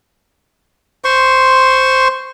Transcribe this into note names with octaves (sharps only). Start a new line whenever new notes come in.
C5 C6 C#6